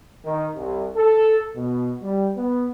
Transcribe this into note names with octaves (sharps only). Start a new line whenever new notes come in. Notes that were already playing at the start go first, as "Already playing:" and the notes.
D#3
C2
A4
B2
G3
B3